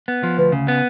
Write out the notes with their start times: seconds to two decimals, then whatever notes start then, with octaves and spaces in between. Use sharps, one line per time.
0.08 B3
0.23 F3
0.38 D2 B4
0.52 C#3
0.68 B3